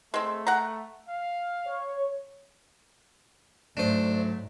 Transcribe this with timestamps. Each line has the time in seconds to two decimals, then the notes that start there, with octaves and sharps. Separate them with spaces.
0.14 G#3 A3 C4
0.47 F#5 A#5
1.08 F5
1.66 C#5
3.77 D2 G#2 F#3 A3 D4 C5